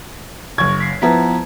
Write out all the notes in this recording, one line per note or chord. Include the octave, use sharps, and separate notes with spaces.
F#1 C#6 G#6
B6 C7
F3 B3 E4 B4 A#5 B6